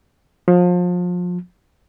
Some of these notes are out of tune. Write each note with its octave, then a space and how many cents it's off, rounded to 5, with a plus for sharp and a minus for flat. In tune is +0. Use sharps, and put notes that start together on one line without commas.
F3 +30